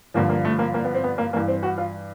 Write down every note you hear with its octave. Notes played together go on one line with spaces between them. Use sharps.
G2 D3 F3 A#3
A#3
A3
A#3
A#3
B3
C4
B3
A#3
G2 E3 A#3
C4
F#4
F4